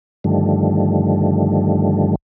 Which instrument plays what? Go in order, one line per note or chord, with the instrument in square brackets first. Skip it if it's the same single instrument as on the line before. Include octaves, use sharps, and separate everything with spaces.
[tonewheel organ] G2 D3 D#3 F3 G3 A3